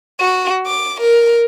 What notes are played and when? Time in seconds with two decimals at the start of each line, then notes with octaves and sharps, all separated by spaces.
0.20 F#4
0.66 D6
1.00 A#4